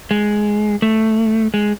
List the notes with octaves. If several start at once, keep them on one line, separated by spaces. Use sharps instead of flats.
G#3
A3
G#3